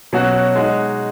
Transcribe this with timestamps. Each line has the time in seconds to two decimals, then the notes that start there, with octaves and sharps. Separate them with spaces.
0.13 B2 F#3 C#4 F#4
0.56 G#3 D#4 F#4